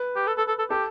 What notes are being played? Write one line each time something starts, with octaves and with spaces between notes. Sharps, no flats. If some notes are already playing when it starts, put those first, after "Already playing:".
Already playing: B4
G4
A4
A4
A4
A4
G4 A4